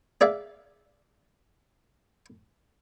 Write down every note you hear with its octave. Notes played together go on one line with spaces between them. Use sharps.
G#4 D5 E5 F5